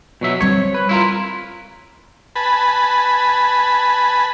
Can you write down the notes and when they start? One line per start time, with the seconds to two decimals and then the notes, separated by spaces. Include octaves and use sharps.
0.21 B2 F#3 E5
0.41 G3 C4 C#5
0.74 B4
0.89 E4 F4 A#4
2.36 B4 G#5 A5 B5